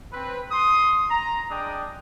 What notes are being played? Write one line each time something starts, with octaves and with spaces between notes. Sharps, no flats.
C4 B4
C6 D#6
A#5
G#3 D4 G5 D#6